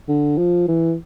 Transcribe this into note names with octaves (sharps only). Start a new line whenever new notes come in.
D3
F3
E3